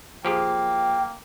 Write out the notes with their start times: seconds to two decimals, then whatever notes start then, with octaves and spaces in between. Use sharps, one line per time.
0.25 F3 A#3 G4 G#4 G5